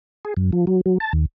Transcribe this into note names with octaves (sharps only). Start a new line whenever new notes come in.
G#4
F#2
F3
F#3
F#3
A5
D#2